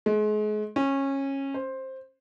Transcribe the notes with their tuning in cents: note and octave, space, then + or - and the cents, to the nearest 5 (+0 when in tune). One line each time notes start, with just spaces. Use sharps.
G#3 +35
C#4 -20
C5 +10